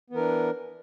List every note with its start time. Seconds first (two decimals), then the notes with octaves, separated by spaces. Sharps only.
0.10 B3
0.13 E3
0.16 A#4
0.19 D4